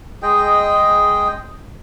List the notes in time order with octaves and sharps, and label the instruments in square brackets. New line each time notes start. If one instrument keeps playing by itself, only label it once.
[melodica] G#3 G#4 D#5 G5